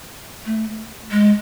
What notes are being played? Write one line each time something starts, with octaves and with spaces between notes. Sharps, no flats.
A3
G#3